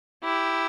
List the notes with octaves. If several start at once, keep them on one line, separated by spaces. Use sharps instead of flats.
E4 G4